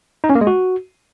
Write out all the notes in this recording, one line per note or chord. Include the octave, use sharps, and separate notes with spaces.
D#4
C#4
A#3
G#3
F#4